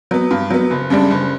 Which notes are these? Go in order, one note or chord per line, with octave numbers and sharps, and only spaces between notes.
F#3 B3
G2
F#3 B3
F#1
F#2 C#3 G3 D4
F#1